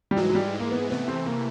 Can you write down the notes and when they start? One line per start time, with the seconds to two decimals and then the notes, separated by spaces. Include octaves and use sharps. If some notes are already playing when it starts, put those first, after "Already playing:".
0.11 G3
0.16 G#2 E3 F#3 G#3
0.29 F#3
0.35 G3
0.59 A#3
0.71 B3
0.90 C3 E3 A3 B3
1.08 C4
1.26 A#3